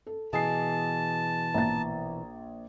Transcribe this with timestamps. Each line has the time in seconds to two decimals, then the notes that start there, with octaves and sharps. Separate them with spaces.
0.07 A4
0.33 B2 E3 G#4 D#5 G#5 A5 D#6 C7
1.54 A#1 A#5 A6